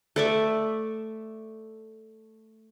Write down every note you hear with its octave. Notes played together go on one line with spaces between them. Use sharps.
A3 D5 E5